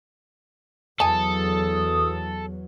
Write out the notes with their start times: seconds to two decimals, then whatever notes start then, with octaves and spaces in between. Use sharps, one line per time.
1.00 E2 F#3 A4 G#5 A5 D#6